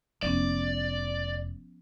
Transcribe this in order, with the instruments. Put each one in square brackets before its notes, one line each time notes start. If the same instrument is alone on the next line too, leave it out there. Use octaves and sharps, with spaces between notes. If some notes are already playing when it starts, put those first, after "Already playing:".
[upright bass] F1 [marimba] F3 B3 C#4 [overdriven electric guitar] D5